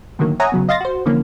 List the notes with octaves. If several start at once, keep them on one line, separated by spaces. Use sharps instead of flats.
A2 D3 D#3 F#3 A#3
C#5 E5 F#5 G#5 A#5 D#6
C#3 F#3 B3
D#5 F5 C6 A6 A#6
F#4 C5
D3 E3 F3 A#3 C#4